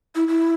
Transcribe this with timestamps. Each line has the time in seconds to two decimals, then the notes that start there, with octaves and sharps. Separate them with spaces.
0.15 E4
0.28 E4